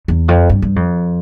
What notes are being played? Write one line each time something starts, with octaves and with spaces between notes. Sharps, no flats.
E2
F2
G2
G2
F2